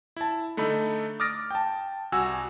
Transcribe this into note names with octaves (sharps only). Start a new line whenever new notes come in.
E4 A5
D3 A3 D#4 B5
D6 D#6 F6 A6 A#6 D7
G5 A5
C2 F#4 G#5 E6